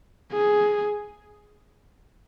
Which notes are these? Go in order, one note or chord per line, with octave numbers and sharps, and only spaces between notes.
G#4